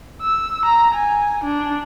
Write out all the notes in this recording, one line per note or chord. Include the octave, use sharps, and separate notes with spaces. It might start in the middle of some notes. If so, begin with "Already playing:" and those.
E6
A#5
G#5
D4